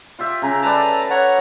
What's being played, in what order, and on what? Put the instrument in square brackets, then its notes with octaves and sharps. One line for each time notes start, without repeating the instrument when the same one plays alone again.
[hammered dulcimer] F4 G4 E5
C#3 A#5
[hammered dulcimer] A4 B4 D5 [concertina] A5 A#5
[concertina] C#5 F#5 A#5